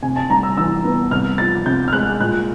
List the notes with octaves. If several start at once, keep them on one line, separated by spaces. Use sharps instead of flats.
C3 G#5
A5
G3 A#5
E6
E3 E6
B3
C2 F6
F3 A6
C3 G6
F6
G#3 F#6
A#2 F#6